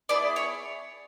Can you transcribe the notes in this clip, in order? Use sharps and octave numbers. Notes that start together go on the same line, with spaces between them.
B3 E4 G#4 D5
C#5